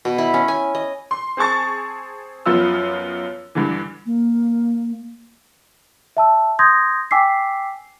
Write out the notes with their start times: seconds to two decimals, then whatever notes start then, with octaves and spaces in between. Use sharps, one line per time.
0.05 B2
0.18 E4
0.34 C#4
0.48 G#5
0.75 D#5
1.11 C6
1.37 C4 G#4 A5 C#6 A6
2.46 F#2 F3 B3 F4 E6
3.55 G2 D3 E3
4.06 A#3
6.17 E5 A5 E6
6.59 C6 D#6 G6 G#6 A#6
7.11 G5 G#5 D6 E6 B6 C7